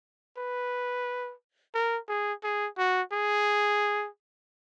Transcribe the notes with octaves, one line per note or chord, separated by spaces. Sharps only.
B4
A#4
G#4
G#4
F#4
G#4